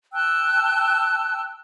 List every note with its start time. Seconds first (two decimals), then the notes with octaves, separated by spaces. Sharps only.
0.12 G5 A5 E6 F#6